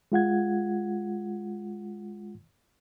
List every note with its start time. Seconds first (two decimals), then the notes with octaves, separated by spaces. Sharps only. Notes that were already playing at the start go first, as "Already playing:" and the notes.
0.12 G#3 F4 F#5 G#6